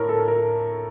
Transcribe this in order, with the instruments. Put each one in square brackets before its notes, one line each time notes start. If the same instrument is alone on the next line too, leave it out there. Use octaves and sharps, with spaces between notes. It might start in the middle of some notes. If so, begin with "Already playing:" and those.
Already playing: [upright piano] A2 A#4 C#5
A4
A#4